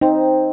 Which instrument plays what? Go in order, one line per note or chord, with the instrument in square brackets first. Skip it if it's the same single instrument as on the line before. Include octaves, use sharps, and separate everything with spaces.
[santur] C4 [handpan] D#4